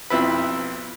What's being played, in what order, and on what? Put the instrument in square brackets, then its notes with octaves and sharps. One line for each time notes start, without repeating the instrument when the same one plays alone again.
[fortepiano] B1 F2 E4 B4